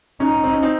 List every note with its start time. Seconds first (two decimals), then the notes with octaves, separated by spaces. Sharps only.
0.20 C#4 D#4
0.44 C4
0.53 C#4
0.63 C4 D#4